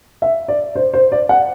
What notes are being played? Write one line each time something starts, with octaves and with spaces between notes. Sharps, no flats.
E5
D5
C5
C5
D5
F#5